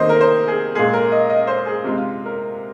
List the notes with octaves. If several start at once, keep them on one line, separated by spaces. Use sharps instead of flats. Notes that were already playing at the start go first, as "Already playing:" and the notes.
Already playing: C3 D#3 A#3 C5 D#5
A#4
C5
G#4
A#2 G#3 G#4
A#4
D#5
D#5
C5
G#4
C3 G#3 F4
F4
A#4